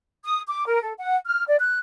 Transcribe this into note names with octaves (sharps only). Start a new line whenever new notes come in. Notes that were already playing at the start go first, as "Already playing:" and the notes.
D#6
D6
A#4
A4
F#5
F6
D5
F#6